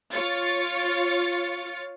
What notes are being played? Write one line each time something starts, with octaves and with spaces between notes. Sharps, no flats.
F4 C#5 A6 C#7